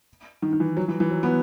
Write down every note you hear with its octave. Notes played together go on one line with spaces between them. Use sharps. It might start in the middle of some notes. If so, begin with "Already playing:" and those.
D#3
D#3
E3
F#3
E3
E3
F#3
B3